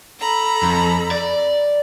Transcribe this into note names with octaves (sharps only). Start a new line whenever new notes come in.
A4 A#5 B5
F2
D5